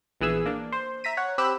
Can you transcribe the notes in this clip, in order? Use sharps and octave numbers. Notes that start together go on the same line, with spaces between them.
A#1 E3 B3 G#4 E6
A#3 D4
C5
E5 A#5 B6 D#7
C#5 F#5
C4 G4 B5 E6 F#6 E7